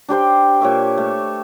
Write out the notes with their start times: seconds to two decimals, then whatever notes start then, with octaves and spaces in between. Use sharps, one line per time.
0.09 D4 G4 C5 G5
0.60 A#2 C#5 E5 D6
0.98 A3